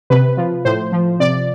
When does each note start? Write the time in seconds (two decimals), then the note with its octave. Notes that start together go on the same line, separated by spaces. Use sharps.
0.10 C3 B4
0.37 F3
0.65 A2 C5
0.92 F3
1.20 C3 D5